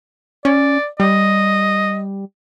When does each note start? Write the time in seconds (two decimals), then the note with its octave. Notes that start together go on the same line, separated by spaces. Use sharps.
0.45 C#4 D5
1.00 G3 D#5